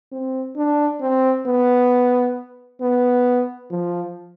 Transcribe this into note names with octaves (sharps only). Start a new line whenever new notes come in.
C4
D4
C4
B3
B3
F3